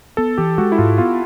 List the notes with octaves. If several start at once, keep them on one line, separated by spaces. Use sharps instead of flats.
B3 A4
E3 G4
G#3 F#4
E4
G#2 F4
B3 F4